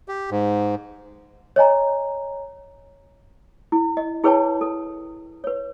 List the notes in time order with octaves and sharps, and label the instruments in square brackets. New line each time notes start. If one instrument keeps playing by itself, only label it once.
[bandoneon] G4
G#2
[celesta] C#5 D#5 G#5 A#5
[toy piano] E4
D#5
E4 G#4 B4 C#5 G5 A5
A4
B4 C#5